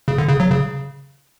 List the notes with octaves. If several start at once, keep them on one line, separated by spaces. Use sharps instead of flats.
C#3
D3
C#3
F#3
C#3